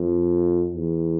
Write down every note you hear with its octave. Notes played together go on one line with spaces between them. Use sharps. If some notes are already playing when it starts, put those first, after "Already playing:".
Already playing: F2
E2